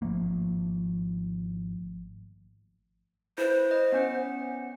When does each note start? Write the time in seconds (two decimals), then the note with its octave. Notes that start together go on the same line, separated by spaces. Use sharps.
0.02 G#1 F3 A3 A#3
3.38 E4 B4 C5
3.71 D#5
3.92 B3 C#4 F#5